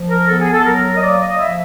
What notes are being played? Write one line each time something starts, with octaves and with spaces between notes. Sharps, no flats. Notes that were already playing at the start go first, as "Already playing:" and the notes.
Already playing: F3
A#4
B3 A4
G#4
A4
F#3 A#4
D#5
A#3 D5
D#5
F3 E5